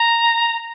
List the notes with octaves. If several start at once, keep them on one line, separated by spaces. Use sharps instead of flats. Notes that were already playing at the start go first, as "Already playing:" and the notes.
Already playing: A#5